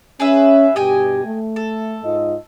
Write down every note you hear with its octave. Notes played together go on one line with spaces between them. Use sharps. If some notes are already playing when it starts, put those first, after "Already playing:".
C#4 G#4 B4 E5
G2 B2 G4 D#5 G5 G#5
A3
A4
G#2 F4 D#5